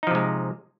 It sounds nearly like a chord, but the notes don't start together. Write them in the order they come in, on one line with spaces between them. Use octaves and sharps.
D#4 F3 C3 G#3